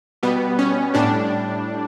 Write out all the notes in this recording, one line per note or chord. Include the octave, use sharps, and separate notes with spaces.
B2 G3 B3
C#4
A2 G3 D4